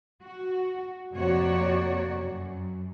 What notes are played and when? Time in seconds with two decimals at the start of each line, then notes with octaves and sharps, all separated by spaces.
0.24 F#4
1.16 F2 C3 A#3 F#4 C#5 D5
2.16 F#2